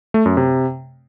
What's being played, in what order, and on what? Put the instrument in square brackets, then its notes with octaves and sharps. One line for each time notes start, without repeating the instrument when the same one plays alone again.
[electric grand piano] A3
F#2
C3